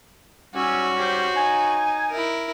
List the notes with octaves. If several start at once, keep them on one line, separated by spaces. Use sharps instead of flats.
G#2 G3 C#4 F#4 C#5 G#5 E6
G4 C5
D#4 G#5
E4 A#4